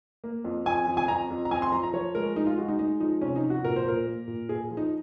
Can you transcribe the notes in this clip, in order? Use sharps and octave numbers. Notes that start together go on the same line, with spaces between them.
A#3
F2
F2 G#5
F2
G#5
F2 A#5
F2
A#5
F2 G#5
C6
F3 A#5
A#5
F3 C#5
G#3 A#4
G#3 D#4
F4
G#3 F#4
D#4
G#3 D#4
F3 D#4
C3 C#4
D#4
F3
F#4
A#2 A#4
C5
A#2 A#4
A#3
A#2
A#2 G#4
F3
D#4